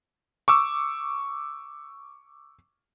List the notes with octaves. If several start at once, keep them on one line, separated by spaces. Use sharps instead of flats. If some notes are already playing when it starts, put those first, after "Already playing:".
C#6 D6 E6